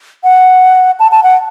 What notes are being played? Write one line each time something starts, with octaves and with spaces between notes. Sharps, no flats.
F#5
A5
A5
F#5